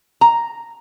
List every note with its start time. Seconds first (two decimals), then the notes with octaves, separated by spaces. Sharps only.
0.21 A#5